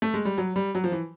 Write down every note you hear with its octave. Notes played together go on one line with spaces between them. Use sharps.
A3
G#3
G3
F#3
G3
F#3
F3
E3